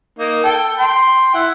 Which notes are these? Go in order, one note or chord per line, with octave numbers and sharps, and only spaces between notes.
A#3 D#4
A4 G5
G5 C6
E4 F#5